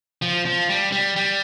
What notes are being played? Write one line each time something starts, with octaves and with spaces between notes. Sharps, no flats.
F3
F3
G3
G3
G3